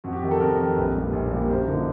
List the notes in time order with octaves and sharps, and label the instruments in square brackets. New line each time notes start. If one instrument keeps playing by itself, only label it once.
[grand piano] F2 F#4
G4
C3 D#3
A4
F2 A#4
C3 D#3
A#1 B4
A#2 G3
A#1
A#2 G3
F#2 C5
D3 F3 A#3 D#4